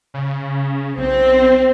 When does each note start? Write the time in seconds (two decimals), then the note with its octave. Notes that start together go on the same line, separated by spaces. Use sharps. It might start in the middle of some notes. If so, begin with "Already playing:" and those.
0.14 C#3
0.97 B1 C4